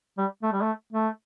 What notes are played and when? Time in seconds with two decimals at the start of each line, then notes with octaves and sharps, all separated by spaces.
0.18 G3
0.43 A3
0.52 G3
0.62 A3
0.93 A3